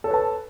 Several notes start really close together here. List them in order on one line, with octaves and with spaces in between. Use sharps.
A4 C#5 B4 A5